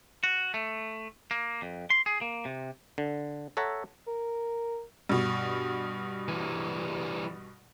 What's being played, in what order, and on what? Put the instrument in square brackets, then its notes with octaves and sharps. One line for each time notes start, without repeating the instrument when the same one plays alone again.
[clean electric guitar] F#4
A3
A#3
F2
C6
G#4
A#3
C3
[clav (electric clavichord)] D3
A4 C#5 E5 F#5 A#5
[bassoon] A#4
[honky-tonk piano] G2 B2
[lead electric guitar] E3 G3